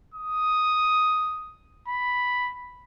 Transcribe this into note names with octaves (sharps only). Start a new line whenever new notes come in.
D#6
B5